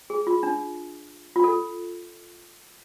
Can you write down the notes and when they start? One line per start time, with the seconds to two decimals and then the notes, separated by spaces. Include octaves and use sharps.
0.10 G#4
0.27 F4
0.43 D4
1.36 F4
1.44 A4